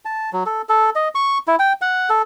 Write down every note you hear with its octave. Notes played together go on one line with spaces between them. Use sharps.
A5
F#3
A4
A4
D#5
C#6
E4
G5
F#5
A4